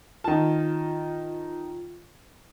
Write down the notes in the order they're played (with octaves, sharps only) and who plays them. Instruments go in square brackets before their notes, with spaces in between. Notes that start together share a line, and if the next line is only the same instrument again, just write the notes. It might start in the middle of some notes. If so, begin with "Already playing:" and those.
[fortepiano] D#3 A5 [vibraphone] F4